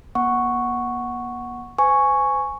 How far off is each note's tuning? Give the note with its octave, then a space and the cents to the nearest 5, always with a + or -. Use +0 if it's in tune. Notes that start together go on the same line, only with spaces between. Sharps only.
A#3 +45 F#5 +0 C#6 +0
C5 -40 G#5 +0 C#6 +0